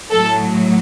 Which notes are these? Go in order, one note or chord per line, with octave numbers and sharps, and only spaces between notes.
A2 F#3 A4